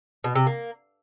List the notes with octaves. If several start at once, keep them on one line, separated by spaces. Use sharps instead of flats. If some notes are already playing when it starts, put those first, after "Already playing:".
B2
C3
A#3